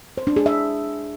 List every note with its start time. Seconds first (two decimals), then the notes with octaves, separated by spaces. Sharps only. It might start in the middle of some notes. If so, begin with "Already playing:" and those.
0.18 C5
0.27 D4
0.36 G#4
0.46 E5